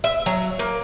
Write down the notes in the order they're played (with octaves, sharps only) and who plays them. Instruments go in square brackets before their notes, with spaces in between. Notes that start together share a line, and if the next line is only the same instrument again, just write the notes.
[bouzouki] E5
F#3
A#3